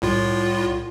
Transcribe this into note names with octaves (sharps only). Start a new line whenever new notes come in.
C2 A2 F4